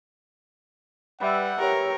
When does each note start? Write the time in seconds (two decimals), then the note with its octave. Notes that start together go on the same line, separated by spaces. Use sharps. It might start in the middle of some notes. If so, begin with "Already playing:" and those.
1.21 G3 B4 E5 F#5 E6
1.60 G4 A#4 C#5